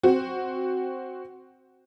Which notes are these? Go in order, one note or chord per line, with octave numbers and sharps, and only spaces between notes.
C4 F#4